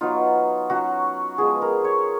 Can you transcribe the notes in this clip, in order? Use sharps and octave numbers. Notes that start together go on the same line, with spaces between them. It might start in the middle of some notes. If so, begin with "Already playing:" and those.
F#3 B3 D#4 F4
F#3 C#4 F4 F#4
F3 G#3 B3 F4 G#4
A#4
C#5